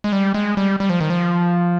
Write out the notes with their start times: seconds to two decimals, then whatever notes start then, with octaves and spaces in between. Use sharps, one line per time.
0.04 G#3
0.12 G3
0.34 G#3
0.57 G3
0.80 G3
0.90 F3
1.01 D#3
1.10 F3